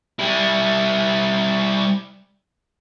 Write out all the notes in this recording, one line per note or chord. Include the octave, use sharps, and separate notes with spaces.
G3 E4